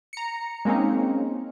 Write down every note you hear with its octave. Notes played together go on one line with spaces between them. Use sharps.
A#5 C#7
G#3 A#3 C4 C#4 D#4